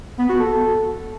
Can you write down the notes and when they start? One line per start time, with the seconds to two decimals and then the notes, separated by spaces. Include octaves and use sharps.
0.19 B3
0.29 F#4
0.40 A4